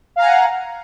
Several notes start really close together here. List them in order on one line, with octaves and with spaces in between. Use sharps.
F5 A#5 G#5 F#5